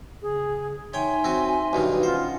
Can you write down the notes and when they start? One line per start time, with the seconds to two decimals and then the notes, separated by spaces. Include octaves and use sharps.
0.22 C#3 G#4
0.94 D#4 C#5 E5 G5 G#5 C6
1.24 C4 F#4
1.73 B1 G2 D#3
2.03 C#4 F4 C5 D#5 F#5